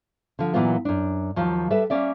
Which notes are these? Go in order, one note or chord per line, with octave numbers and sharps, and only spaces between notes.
D3 F3
A#2 E3 F#3 A#3 B3 F4
F#2 D4
D#2 F3 F#3 F4
G3 A4 B4 E5
A#3 C#4 D5 E5